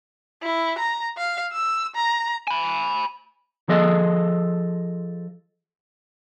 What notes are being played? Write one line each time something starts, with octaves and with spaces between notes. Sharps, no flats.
E4
A#5
F5
E6
A#5
G#5 B5
F3 G#4 A4 D#5